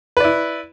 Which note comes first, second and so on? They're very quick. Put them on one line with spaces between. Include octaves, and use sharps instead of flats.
B4 D5 E4